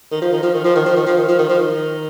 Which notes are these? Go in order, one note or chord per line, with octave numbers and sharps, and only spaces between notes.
D#3
F3
D#3
F3
D#3
F3
D#3
F3
D#3
F3
D#3
F3
D#3
F3
D#3